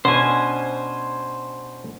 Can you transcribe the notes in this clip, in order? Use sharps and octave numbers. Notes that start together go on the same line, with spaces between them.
B2 C#4 D4 C5 G#5